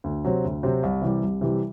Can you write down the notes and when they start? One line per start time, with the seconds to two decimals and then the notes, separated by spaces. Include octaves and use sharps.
0.04 D2
0.24 C3 F#3 C4
0.44 D2
0.63 C3 F#3 C4
0.83 C2
1.02 C3 E3 G3
1.23 C2
1.41 C3 E3 G3